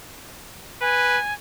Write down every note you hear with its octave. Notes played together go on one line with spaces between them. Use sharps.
B4 G#5